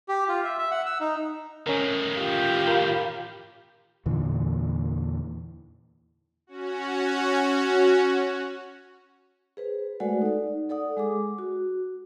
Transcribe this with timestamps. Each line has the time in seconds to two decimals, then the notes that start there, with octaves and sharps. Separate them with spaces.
0.09 G4
0.28 F4
0.44 E5
0.59 E5
0.71 F#5
0.86 E6
1.00 D#4
1.67 A2 D#3 C#4 A#4
2.17 F4 G4
2.67 A#4 B5
4.06 E2 A#2 D3 E3
6.47 C#4 F#4
9.57 G#4 B4 C5
10.00 G#3 A3 F#4 A4 D5 F#5
10.22 D#4 D5
10.69 A4 D5 F#5 D#6
10.97 G#3 G#4 D6
11.38 F#4